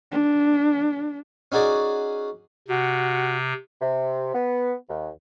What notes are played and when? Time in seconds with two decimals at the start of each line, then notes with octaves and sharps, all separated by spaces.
0.12 D4
1.52 C#4 D#4 F#4 G#4 D5
2.68 C3 F#4
3.81 C3
4.33 B3
4.88 D#2